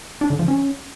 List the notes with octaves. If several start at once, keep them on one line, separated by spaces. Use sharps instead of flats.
D4
D3
F3
C#4